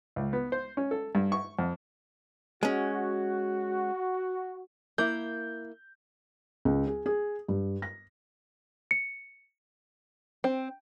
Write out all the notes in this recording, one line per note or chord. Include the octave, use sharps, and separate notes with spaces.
C#2
B3
C5
C#4
A4
G2
C#6
F2
G#3 C#4 F#4
A#3 E4 G6
C#2
G#4
G#4
G2
A#6
C#7
C4